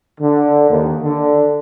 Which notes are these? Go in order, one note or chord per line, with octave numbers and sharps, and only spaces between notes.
D3
D#2
D3